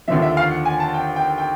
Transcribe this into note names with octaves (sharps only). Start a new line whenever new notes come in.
D#2 D3 F3 E5
E5
F5
F#5
G#5
A5
G5
G5
G5